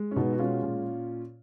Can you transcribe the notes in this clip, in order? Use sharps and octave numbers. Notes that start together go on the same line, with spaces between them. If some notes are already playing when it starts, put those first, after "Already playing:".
Already playing: G#3
C#4
B2 B3 D#4
F#4
G#3 C#4 F4
A#2